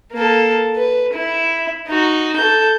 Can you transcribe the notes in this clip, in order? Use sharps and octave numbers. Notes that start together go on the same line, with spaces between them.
A#3 A4
B4
E4
D#4 F#4
A4 G6